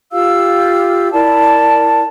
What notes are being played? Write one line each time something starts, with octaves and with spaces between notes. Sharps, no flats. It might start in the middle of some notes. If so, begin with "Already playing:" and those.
F4 G4 F5 E6
E4 A#4 D5 A5